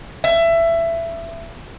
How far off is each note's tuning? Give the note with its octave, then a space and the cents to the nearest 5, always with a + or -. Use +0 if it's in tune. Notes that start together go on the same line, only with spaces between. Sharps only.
E5 +20